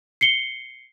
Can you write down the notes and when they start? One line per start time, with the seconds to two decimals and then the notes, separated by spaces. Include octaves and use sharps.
0.21 C7 C#7 G7